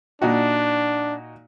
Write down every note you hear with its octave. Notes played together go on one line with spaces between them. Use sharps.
A#2 D4 D#4 F#4